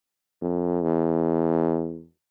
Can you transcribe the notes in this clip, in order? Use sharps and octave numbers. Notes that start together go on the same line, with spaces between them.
F2
E2